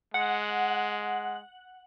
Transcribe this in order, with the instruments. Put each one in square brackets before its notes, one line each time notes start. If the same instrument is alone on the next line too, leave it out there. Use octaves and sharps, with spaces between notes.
[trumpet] G#3 [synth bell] F#5